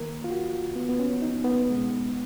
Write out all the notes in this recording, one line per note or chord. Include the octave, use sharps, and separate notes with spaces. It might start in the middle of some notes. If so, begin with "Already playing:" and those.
Already playing: D#2 D#3 A#3 A#4
F4
F#4
B3
B3
C#4
D#4
B3
C#2 B2 G#3